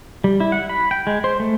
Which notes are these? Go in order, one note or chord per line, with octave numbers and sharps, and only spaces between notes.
G3
E4
F#5
B5
G5
G#3
C5
A3